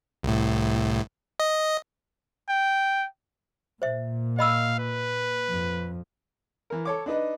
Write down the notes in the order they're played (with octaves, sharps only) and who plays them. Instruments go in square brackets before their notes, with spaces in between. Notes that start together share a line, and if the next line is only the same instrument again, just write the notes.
[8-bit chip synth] C2 A2
D#5
[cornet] G5
[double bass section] A#2 [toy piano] C5 E5
[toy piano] D#5 B5 E6 [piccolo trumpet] F5
[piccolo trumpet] B4
[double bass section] F2
[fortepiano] E3 A#4
A4 C#5 D6
D4 D#4 B4 D#5